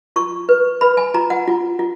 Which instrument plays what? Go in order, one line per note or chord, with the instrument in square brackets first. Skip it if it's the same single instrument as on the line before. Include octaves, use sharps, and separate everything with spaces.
[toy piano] F4 C#6
B4
B4 B5
G#5
F4 A#5
F#5
F4
F4